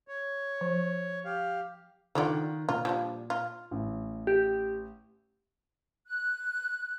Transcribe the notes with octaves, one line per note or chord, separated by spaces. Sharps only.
C#5
F3
G4 F5
D3 D#3 F4 D5 F#5
A#2 F4
F3 G3 D4
F4
A1
G4
F#6